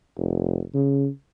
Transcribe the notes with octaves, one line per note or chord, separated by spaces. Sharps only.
F1
C#3